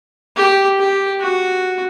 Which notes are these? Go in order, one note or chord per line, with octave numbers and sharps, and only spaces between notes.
G4
G4
F#4